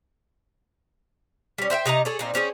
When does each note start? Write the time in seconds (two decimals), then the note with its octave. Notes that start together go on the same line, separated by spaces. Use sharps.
1.58 G3 C#4
1.70 C5 E5 F5 G5
1.86 C3 D#4 D#5 A#5
2.05 G#4 A4 C#5
2.19 A#2 C4 D#4
2.34 C4 C#4 F#4 G#4